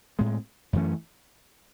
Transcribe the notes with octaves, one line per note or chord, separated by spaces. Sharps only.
A2 G#3 C4
F#2 E3 A3 C#4